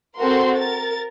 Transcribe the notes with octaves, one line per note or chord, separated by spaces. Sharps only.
C4 F#4 A4 A#4 C6
A#4 A6